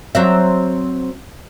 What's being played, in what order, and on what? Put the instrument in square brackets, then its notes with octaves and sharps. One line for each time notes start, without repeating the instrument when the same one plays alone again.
[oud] F#3 C4 E5